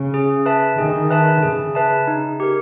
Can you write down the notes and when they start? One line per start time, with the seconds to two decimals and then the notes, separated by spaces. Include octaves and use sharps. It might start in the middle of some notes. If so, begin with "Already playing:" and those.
Already playing: C#3
0.14 G#4
0.46 B4 E5 A5
0.78 D#3 G#4
1.11 B4 E5 A5
1.42 C#3 G#4
1.75 B4 E5 A5
2.07 D#4
2.40 G4 A#4